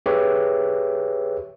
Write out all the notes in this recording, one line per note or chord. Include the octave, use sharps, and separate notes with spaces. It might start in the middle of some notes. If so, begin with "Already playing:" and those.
G4 G#4 B4 C#5 E5